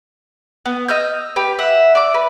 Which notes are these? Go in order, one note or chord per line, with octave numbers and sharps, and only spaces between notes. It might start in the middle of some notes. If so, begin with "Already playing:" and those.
B3
D#5 E6 F6 G6
G4 B4
E5 F#5
D5 D6
B4